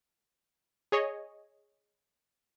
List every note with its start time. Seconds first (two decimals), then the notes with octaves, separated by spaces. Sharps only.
0.92 G#4 C#5 D#5